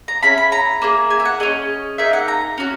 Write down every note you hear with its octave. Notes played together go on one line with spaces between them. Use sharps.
A#5
C#4 E4 G#4 B5
B5
A#5
A#3 E4 G#4
G#5
E5
F#5
C#4 G#4 D#5
A#3 D#4 G#4 E5
F#5
A#5
C#4 F#4